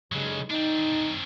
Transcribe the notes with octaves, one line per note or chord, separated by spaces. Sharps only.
B1 G2 C#3 F#3 G#3
C4 D4 D#4